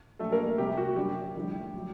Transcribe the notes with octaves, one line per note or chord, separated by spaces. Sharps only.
A#1 A#2 F#3 A3 A4
A#3 A#4
D2 C3 G3 G4
F#4
F#2 D3 G3 G4
A#1 A2 G3
F#3